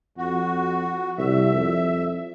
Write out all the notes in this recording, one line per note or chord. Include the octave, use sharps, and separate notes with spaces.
F2 F#4
C2 E5
F2